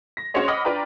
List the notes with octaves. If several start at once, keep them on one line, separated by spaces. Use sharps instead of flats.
A#6
C#4 F#4 G#4 C5 C#5 D#5
D#5 F#5 B5 D6 D#6 F6
D4 F4 B4 D5 G5 A#5